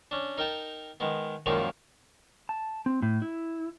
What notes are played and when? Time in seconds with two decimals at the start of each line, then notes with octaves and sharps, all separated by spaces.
0.11 C#4 D4
0.37 D#4 A#4 G5 A5
1.00 D#3 G#3 B3
1.46 F#2 A#2 D#3 F3 G#3 D#4
2.49 A5
2.86 C4
3.02 A2
3.22 E4